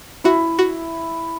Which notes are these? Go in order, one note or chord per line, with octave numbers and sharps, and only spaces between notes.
E4 F#4
F#4